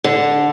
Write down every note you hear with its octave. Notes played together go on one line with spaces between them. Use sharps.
D3